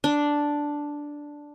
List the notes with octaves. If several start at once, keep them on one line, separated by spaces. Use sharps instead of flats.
D4